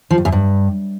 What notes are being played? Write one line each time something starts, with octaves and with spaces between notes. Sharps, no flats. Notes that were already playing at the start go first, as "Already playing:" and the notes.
F3
G2
F#2
G2